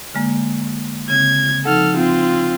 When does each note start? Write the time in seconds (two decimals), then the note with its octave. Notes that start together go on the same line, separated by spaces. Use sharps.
0.15 D3 G#3 A#3
1.10 C#3 C4 G#6
1.65 F3 D#4 A4 F#5 F6
1.97 C4 F4